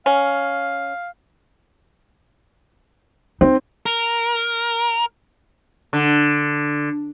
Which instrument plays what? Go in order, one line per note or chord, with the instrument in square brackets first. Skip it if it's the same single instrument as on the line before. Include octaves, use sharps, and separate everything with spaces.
[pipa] C#4 [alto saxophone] F5
[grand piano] C4 [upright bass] D#4
[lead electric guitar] A#4
[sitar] D3